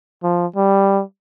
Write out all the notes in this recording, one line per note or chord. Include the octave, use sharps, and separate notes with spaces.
F3
G3